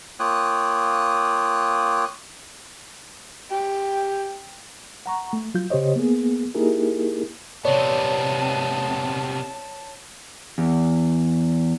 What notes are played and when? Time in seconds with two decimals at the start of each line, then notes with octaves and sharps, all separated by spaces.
0.20 A#3 F4 C#5 G5 D#6 F#6
3.51 G4 G5
5.06 F#5 A#5 C#6
5.33 A3
5.54 F#3 F4 G6
5.70 C#3 G4 C5 C#5 D#5
5.96 A#3 B3 G#4
6.54 A#3 D#4 E4 G4 G#4 A#4
7.65 C3 B3 C#5 D5 A5
10.58 E2